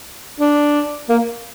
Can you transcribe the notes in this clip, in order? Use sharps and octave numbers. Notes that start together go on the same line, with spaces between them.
D4
A#3